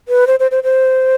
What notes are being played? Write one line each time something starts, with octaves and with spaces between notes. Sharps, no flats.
B4
C5
C5
C5
C5